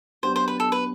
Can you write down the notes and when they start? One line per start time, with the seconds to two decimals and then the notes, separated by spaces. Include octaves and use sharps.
0.23 F#3 B3 D4 G4 C5
0.36 C5
0.48 B4
0.60 A4
0.72 B4